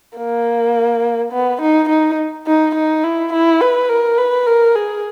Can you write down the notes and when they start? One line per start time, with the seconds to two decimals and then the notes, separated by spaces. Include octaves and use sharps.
0.18 A#3
1.32 B3
1.61 D#4
1.89 D#4
2.47 D#4
2.75 D#4
3.04 E4
3.33 E4
3.61 B4
3.89 A#4
4.18 B4
4.47 A#4
4.76 G#4